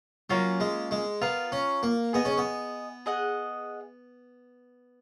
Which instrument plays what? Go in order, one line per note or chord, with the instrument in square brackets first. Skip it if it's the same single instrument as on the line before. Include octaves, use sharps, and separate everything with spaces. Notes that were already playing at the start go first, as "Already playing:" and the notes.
[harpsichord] F#3 [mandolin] A#3 C#4 F4
[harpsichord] G#3
G#3
[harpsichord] B3 [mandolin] F4 A#4 F5
[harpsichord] C#4
A#3
[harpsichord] B3 [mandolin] G#4 D#5 G#5
[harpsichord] C#4
B3
[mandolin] G#4 D#5 F#5